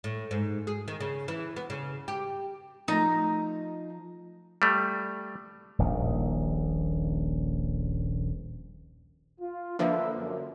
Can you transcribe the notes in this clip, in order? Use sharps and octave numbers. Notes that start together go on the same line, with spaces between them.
A2
G#2
G#4
D#3
C#3
E3
B3
C#3
G4
F3 A3 D#4 A#5
G3 A3
D#1 A#1 D#3
F4
D3 F3 A#3 B4 E5
F#2